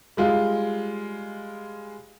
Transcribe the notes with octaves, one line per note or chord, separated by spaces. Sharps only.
G3 G#3 F4